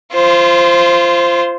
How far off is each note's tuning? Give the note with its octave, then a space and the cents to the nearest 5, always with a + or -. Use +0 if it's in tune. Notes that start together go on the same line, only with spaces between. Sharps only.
F4 -25 C5 +0